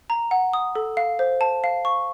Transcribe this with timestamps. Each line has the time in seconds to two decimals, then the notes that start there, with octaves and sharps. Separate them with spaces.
0.10 A#5
0.31 F#5
0.53 D#6
0.75 A4
0.97 F5
1.19 C5
1.41 A5
1.64 F5
1.85 C#6